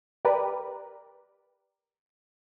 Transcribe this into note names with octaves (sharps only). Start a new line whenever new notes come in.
G4 A#4 B4 D5